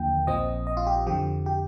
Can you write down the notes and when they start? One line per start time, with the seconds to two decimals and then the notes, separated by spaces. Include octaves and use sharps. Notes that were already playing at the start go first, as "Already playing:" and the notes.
Already playing: D#2 D3 F3 A#3 G5
0.27 A#1 A#2 F3 C4 D#5
0.67 D#5
0.77 F4
0.87 G4
1.06 F2 D3 F3 G4
1.46 G4